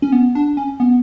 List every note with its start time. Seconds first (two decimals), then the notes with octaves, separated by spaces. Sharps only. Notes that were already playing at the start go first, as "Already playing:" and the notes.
0.02 C#4
0.12 B3
0.35 D4
0.57 C#4
0.80 B3